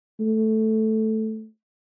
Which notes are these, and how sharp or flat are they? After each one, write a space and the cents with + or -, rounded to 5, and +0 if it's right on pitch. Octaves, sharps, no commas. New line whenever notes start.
A3 -5